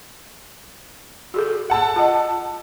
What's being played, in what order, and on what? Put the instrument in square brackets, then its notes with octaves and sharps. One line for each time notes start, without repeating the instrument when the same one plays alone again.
[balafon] F#4 G#4 A4
[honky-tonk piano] F#5 A5 E6
[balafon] F4 D#5